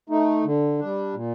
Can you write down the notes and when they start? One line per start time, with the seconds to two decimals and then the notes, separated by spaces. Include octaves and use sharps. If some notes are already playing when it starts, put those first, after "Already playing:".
0.09 A3 D#4
0.45 D3
0.79 G3 D4
1.14 A#2